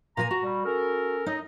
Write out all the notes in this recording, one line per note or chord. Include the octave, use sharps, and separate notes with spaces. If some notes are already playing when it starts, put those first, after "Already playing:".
A#2 A#4 G#5 A#5
F#4
G3
C#4 A4 A#4
F#3 D#4 D#5